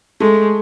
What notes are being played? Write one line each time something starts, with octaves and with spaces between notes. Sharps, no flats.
G#3 A3